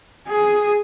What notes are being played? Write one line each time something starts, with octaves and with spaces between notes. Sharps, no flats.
G#4